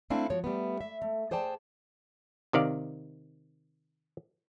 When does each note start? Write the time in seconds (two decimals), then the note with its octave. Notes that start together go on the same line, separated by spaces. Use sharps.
0.10 A3 C4 D4 E4 F5 G#5
0.30 F3 F#4 C#5
0.44 G3 A3 B3
0.81 E5
1.02 A3
1.31 G#4 C5 D5 G5 A5
2.53 C3 D#3 D5 F5